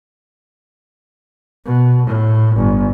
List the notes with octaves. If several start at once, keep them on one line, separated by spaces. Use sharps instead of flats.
B2
A2
G1